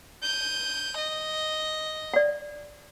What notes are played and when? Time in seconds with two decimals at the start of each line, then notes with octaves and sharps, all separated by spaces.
0.23 G6 D#7
0.97 D#5
2.14 D5 F#5